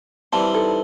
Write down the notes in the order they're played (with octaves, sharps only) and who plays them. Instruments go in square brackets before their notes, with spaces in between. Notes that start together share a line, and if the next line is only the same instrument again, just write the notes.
[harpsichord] E3 G3 C4 [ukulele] A5
[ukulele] D#4 A4